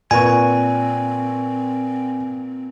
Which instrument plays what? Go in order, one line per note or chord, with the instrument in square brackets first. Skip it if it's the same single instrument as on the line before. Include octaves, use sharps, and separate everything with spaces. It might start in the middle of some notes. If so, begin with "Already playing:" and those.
[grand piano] A#2 B4 C#6 [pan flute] C4 [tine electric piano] G#5